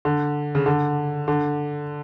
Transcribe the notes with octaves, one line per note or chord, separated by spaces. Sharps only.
D3
C#3
D3
D3